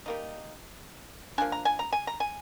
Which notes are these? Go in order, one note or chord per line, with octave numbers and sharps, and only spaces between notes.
G3 A#3 D#4
F3 A#3 D4 G#5
A#5
G#5
A#5
G#5
A#5
G#5